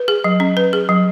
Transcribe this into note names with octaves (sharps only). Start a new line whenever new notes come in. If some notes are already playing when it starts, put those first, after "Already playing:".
Already playing: B4
G#4
F#3
C#4
B4
G#4
F#3